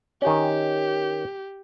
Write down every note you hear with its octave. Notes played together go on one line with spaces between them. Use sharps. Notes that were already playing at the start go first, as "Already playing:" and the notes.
D#3 C#4 G4